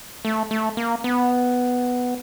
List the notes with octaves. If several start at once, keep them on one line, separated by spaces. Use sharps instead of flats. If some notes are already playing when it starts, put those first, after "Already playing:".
A3
A3
A#3
B3